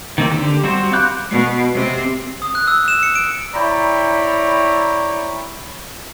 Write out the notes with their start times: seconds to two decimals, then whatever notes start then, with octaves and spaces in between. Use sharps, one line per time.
0.18 D#3 A#3 C4
0.31 D3 G4
0.64 G3 C4 F#4 C5
0.93 F5 B5 D6 F#6 G6
1.31 B2
1.74 C3 C4
2.42 D#6
2.55 F#6
2.67 E6
2.88 E7
3.03 C#7
3.15 D7
3.55 E4 C#5 D5 G5 A#5 B5